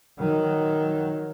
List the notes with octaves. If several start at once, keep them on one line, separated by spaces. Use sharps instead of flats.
D#3 F#3